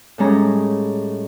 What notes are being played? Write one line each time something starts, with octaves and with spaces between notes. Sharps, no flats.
A2 G3 G#3 C#4 A#5